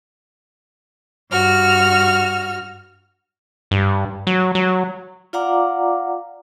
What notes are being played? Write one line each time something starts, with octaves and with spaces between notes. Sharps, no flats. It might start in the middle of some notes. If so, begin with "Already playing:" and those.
G2 F#4 F6
G2
F#3
F#3
F4 D5 F5 F#5 A#5 D6